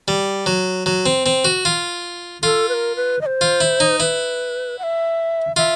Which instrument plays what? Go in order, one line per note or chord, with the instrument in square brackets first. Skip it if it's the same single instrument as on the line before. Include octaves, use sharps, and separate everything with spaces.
[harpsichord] G3
F#3
F#3
C4
C4
F#4
F4
[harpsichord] F4 [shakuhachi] A4
[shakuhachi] B4
A#4
B4
D#5
C5
[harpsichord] F4
E4
D#4
[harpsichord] E4 [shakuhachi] B4
[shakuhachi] F#5
E5
[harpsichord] F4 [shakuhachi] E5